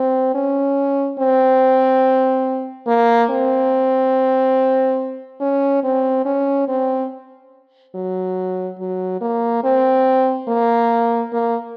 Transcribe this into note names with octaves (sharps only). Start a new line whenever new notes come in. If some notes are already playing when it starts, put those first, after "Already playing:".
Already playing: C4
C#4
C4
A#3
C4
C#4
C4
C#4
C4
F#3
F#3
A#3
C4
A#3
A#3